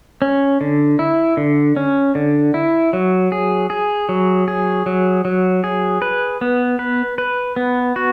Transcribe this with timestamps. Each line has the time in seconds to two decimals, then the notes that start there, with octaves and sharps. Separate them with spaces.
0.22 C#4
0.61 D3
0.99 E4
1.37 D3
1.76 C#4
2.15 D3
2.54 E4
2.93 F#3
3.32 G#4
3.70 G#4
4.09 F#3
4.48 G#4
4.86 F#3
5.25 F#3
5.64 G#4
6.02 B4
6.41 B3
6.79 B4
7.18 B4
7.56 B3
7.96 F#4